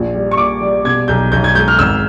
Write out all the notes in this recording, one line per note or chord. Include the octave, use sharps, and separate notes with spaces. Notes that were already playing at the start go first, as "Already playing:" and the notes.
Already playing: A#1 F3
G3
C#6
A#2 D6
G3
B2 G#6
B1 G6
B1 G6
G#6
G#3 G6
F6
G#1 E6